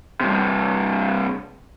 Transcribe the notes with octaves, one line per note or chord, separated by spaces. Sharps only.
G2 C3